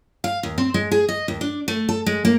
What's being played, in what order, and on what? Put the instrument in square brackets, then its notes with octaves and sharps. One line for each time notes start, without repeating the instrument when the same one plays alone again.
[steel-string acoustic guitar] F5
D#2
C4
G#3
G#4
D#5
D#2
D4
A3
A4
G#3
A#3